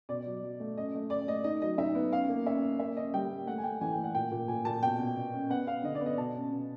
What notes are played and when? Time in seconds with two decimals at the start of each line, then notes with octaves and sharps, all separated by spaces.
0.09 B2 D5
0.26 F#3
0.43 F#3
0.60 A3
0.77 C#4 D#5
0.94 A3
1.10 C#4 D5
1.27 A3 D#5
1.44 D#4 D#5
1.62 F#3 D#5
1.78 D#4 E5
1.95 B3
2.11 C#4 F5
2.29 A#3
2.46 C#4 E5
2.63 C#4
2.79 A#3 E5
2.96 C#4 D#5
3.14 G3 G5
3.30 A#3
3.47 A3 F#5
3.58 G#5
3.64 A3 G5
3.81 E3 G#5
3.93 G5
3.98 A3
4.04 F#5
4.15 A#2 G5
4.31 A#2
4.48 A#2 G#5
4.65 A#2 A5
4.83 B2 G5
4.99 B2
5.17 B2
5.33 C#4
5.50 B3 F#5
5.67 B3 F5
5.83 D3 D#5
5.95 D5
6.01 B3
6.06 D#5
6.17 B2 A5
6.35 C#4
6.52 B2